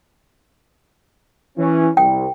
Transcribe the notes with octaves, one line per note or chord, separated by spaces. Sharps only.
E3 C#4
C2 G5